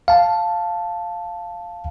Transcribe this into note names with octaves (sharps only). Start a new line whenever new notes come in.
F5 A5